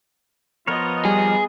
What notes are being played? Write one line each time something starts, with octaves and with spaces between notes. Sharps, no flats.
F3 B3 F4 A#4 C#5 D#5
G3 G#4